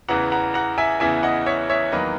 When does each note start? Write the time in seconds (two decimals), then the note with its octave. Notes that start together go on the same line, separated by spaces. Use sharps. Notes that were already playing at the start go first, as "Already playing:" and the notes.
0.09 E2 C#3 E3 B3 F#5 A#5
0.32 F#5 A#5
0.54 F#5 A#5
0.78 E5 G#5
1.00 E2 C#3 E3 B3 E5 G#5
1.23 D#5 F#5
1.46 C#5 E5
1.70 C#5 E5
1.92 E2 D#3 F#3 A#3 B4 D#5